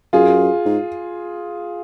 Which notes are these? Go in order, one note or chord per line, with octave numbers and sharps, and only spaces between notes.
F#2 F4 G#4
G#2